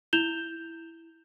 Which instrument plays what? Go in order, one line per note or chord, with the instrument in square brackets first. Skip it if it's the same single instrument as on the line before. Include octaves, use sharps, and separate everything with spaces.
[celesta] E4 G6 E7 F7 G7